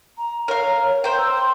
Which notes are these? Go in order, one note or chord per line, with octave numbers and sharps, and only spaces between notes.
A#5
A#4 C#5 F5
C5 G5 A#5
E6
C6